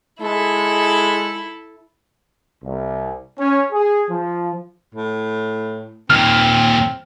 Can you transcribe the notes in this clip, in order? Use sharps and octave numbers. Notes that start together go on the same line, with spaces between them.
G#3 E4 A4
C2
C#4
G#4
F3
A2
D#2 A#2 C4 F6